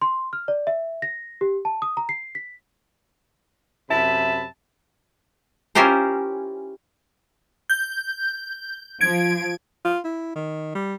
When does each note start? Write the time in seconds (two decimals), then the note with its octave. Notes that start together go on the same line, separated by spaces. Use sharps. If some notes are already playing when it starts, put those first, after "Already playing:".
0.02 C6
0.33 F6
0.48 D5
0.67 E5
1.02 A#6
1.41 G4
1.65 A5
1.82 D#6
1.97 A#5
2.09 C7
2.35 B6
3.89 F#2 C3 E5 A5 B5
5.75 C#4 E4 F4 G4 A#4 C5
7.70 G6
9.01 F3 G#6 D7
9.85 F4
10.04 E4
10.36 D#3
10.75 G3